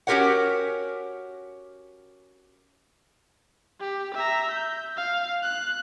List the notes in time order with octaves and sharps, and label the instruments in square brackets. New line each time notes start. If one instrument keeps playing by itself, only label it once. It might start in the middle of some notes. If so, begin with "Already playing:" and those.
[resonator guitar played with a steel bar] C#4 F#4 G4 A#4 C#5 F#5
[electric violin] G4
E5 A#5
G6
F5
F#6